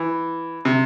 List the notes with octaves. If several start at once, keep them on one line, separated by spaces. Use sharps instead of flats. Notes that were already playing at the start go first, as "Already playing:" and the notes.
Already playing: E3
C3